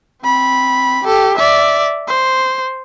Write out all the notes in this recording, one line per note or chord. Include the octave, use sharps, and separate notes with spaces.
C4 B5
G4 A4
D5 E5
C5